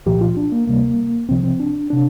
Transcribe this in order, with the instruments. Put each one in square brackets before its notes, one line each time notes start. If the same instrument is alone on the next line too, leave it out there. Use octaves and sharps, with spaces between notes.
[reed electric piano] C2 A#2 F3 G4
F4
D4
A#3
D2 C3 G3 A#3
C2 C3 F3 C4
C4
D4
C3 D4